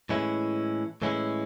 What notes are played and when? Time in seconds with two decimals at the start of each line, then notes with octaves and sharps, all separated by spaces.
0.09 A2 E3 G#3 C#4 E4
1.02 A2 E3 G#3 C#4 E4